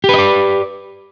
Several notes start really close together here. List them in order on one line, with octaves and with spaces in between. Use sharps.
G4 B4 D#5 D5